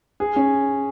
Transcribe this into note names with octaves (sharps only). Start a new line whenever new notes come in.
G#4
C#4